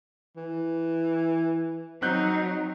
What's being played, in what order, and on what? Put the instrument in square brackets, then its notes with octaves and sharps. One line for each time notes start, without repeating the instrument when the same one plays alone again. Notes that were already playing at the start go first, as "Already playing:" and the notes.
[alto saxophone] E3
[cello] F#3 D#4 [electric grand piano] C4 F#6 G6